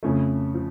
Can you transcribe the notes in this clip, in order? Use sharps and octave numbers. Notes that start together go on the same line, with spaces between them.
F2 C#3 F3 A3
F3